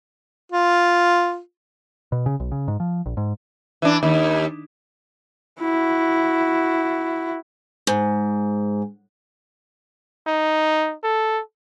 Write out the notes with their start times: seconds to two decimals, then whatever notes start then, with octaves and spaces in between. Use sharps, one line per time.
0.52 F4
2.12 B2
2.26 C#3
2.40 B1
2.52 C#3
2.68 G#2
2.80 F3
3.06 A#1
3.17 G#2
3.82 E3 D4
4.03 D#2
5.60 E4 F#4
7.87 G#2
10.27 D#4
11.03 A4